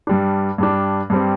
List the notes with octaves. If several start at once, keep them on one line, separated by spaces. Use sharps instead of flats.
G2 G3 D4
G2 G3 D4
G2 G3 C4